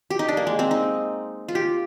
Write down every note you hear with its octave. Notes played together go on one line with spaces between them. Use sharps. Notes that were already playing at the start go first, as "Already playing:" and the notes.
G4
D#4
D4
A#3
G#3
C4
D#4
F4
G4